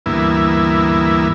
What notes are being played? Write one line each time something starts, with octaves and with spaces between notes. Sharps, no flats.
D2 G2 E3 A#3 B3 E4